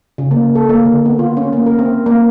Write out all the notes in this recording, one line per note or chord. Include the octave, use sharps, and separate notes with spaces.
C#3
A#3
A4
A#3
D3
B3
F4
C#4
A#3
A#4
C4
A#3